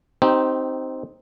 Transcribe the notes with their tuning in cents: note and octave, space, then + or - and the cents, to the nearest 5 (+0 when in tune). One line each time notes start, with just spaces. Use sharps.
C4 +0 D#4 +0 G4 -25